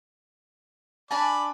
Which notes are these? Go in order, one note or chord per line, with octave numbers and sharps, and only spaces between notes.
D4 D5 G#5 A5 B5